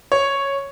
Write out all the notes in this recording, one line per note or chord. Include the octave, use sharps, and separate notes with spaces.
C#5